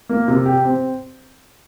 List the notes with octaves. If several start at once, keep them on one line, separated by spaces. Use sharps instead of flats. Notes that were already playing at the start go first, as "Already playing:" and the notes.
A#3
C3
G4
C4